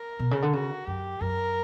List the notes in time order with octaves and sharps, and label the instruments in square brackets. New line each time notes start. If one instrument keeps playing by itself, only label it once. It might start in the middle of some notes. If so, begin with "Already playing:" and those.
Already playing: [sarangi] A#4
[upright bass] B2
C#3
D3
[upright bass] C#3 [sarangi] F#4
[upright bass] F#2 [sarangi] G4
[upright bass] F#2 [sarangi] A#4